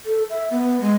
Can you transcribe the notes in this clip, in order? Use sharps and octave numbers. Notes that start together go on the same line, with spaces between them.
A4
E5
B3
G#3